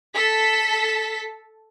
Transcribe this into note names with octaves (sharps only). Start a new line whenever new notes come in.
A4 B6